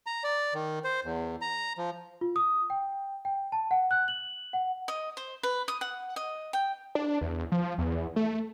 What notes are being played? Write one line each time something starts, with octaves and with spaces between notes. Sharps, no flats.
A#5
D5
D#3
C5
E2
A#5
F3
F4
D#6
G5
G5
A5
F#5
F#6
F#7
F#5
D#5
C5
B4
D#6
F#5
D#5
G5
D4
E2
F3
E2
A3